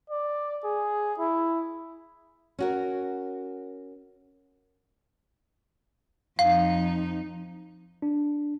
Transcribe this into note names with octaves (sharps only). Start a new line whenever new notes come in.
D5
G#4
E4
C#4 F#4 A#4
F2 D#4 F5
D4